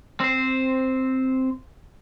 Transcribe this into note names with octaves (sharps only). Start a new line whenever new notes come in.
C4 C5